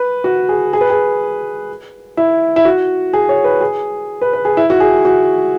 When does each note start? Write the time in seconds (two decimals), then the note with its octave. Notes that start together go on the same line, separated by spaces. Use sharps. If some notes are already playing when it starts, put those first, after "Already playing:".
Already playing: B4
0.24 F#4
0.49 G#4
0.73 G#4
0.81 B4
0.90 G#4
2.17 E4
2.56 E4
2.65 F#4
3.13 G#4
3.29 C#5
3.44 B4
3.61 G#4
4.21 B4
4.33 B4
4.45 G#4
4.57 E4
4.70 F#4
4.80 G#4
5.05 F#4